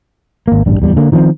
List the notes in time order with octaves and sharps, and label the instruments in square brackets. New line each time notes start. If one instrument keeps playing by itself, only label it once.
[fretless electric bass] G#1 A#3
A1 G2 G3
D1 E2 G3
D3 A#3
D#3 F3 A#3 C4